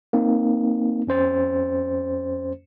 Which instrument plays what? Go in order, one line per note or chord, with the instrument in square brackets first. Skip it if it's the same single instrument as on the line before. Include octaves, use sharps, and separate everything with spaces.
[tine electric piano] A#3 C4 D#4
F2 C#4 C5 A6